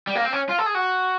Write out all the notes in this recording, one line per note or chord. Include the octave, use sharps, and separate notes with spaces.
G3
A#3
C4
C#4
F4
A4
G#4
F#4